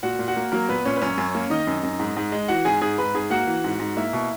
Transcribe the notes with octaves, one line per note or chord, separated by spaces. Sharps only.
A#2 F#4 F#5
A#2
F#4 F#5
A#3
F#3 A#3 A#4
A#2 B3 B4
A#2 C#4 C#5
B4
F#2 C#4 C#5
F#2
A#3
D#3 D#4 D#5
F#2
F#2
G#2
G#2
G#3
E3 F#4 F#5
G#2 G#4 G#5
G#2 G#4 G#5
G#2 B4 B5
G#2 G#4 G#5
A#3 F#4 F#5
E3
G#2
G#2
A#3 E4 E5
B2